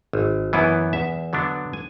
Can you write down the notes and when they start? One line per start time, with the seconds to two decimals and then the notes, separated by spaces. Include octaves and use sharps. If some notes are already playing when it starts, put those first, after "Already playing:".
0.13 G#1
0.53 F#2 E3 B3 E4
0.93 E2 E5
1.33 D3 F#3 B3 D4
1.73 G#5